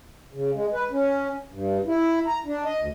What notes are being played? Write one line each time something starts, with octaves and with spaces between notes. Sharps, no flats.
C#3
G#3
B4
C#4
G2
E4
A#5
D4
D#5
D2